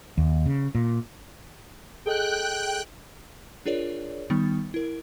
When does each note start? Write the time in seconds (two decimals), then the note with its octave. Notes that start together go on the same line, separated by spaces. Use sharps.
0.18 D#2
0.46 C#3
0.75 A#2
2.06 G#4 A4 D#5 G5 F#6
3.66 D4 F4 G#4 A#4 C#5 D5
4.30 D#3 G3 B3 D#4
4.74 E4 A#4